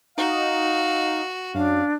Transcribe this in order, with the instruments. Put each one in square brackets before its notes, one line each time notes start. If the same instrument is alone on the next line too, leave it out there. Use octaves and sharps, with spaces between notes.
[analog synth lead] D#4 [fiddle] F#4 [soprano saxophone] F5
[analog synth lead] F#2 [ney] D4 [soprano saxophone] F5